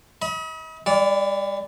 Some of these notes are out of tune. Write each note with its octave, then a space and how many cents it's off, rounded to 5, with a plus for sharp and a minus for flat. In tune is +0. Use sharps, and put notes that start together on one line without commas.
D#5 +40 B5 -30
G3 +40 D5 -15